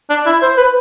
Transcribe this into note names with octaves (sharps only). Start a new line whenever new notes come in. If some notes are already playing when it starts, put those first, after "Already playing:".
D4
E4
C5
B4